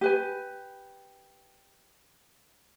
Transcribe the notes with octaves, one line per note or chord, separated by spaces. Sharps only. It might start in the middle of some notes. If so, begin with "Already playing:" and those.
G4 B4 G#5